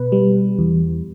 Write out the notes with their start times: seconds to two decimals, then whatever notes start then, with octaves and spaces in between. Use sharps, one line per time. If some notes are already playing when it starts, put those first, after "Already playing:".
Already playing: B2 B4
0.12 G3
0.59 E2